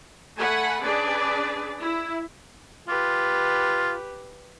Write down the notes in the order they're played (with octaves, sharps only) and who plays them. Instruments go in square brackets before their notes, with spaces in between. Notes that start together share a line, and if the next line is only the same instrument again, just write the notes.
[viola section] A3 F#5 G#5 B5
C#4 D4 G#4 B4 D5
E4
[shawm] F4 [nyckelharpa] G4 B4